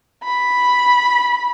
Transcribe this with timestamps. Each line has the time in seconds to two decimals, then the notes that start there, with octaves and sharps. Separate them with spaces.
0.24 B5